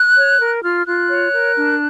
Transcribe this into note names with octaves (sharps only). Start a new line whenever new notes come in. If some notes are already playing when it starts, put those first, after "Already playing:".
Already playing: F#6
C#5
A#4
F4 F6
F4 F#6
C#5
A#4
D4